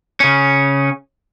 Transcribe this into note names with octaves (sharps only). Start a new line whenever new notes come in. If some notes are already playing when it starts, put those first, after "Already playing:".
C#3 C#4